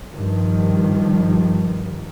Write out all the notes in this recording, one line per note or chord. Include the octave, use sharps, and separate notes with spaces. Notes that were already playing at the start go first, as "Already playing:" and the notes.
G2 D#3 F3